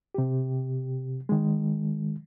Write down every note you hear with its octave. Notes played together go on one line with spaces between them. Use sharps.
C3 G4
D#3 G#3